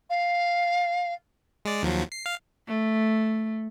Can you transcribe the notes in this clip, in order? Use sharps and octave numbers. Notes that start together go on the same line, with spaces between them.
F5
G#3 D5
D#2 F3 F#3
C7
F5
A3